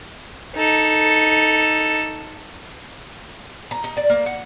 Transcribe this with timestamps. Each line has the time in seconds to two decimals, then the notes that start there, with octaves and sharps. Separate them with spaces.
0.56 D#4 A4
3.71 A#5
3.84 D#4
3.97 D5
4.10 A#3
4.26 F#5